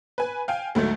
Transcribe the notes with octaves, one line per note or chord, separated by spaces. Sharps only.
B4 G#5
F5 G5 G#5
D2 G#2 F#3 A3